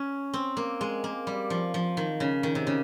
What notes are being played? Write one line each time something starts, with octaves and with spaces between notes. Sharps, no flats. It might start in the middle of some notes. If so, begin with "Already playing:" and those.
Already playing: C#4
C4
A#3
G#3
A#3
G3
F3
F3
D#3
C#3
D#3
C3
C#3